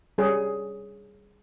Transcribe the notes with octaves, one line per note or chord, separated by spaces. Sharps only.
G3 G#4 C#5